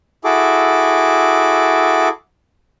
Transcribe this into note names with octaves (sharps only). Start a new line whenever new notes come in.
E4 F#4 G#4 A4 D6